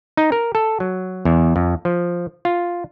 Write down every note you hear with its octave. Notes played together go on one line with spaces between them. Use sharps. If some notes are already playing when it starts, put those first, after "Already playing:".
D#4
A#4
A4
F#3
E2
F2
F3
F4